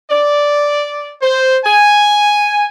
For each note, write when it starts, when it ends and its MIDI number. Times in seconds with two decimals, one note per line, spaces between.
0.10 1.13 74
1.22 1.59 72
1.65 2.67 80